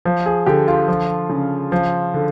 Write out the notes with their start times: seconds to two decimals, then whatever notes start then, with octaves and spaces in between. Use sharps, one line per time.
0.05 F3
0.26 G#4
0.46 D3 G4
0.68 F4
0.88 F3
1.29 C#3
1.72 F3
2.14 D3